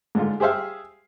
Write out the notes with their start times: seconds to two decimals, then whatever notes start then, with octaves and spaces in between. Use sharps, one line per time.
0.15 G#2 D3 F4
0.40 G4 G#4 C5 E5 F5